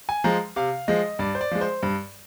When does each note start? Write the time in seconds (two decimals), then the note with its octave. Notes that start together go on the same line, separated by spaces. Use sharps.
0.09 G#5
0.24 F3 G#3 A#5
0.56 C3 F5
0.88 F3 G#3 D#5
1.19 G2 D5
1.35 C5
1.41 D5
1.51 F3 G#3
1.61 C5
1.83 G2